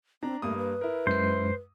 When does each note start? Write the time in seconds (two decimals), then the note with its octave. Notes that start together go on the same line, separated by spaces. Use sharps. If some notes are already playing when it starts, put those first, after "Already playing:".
0.23 C4 D4 A#5
0.42 G2 A3 A#3 D#6
0.58 B4
0.81 E4 A#4
1.07 F#2 G#3 C5 C7